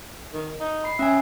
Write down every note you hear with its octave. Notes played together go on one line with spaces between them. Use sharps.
D#3
D#4
B5 C7
C#4 E5 G#5